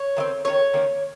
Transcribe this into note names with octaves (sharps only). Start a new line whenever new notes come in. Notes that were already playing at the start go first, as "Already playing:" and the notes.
Already playing: C#5
D#3 G#3 C4
D#3 A#3 C#4 C#5
D#3 A#3 C#4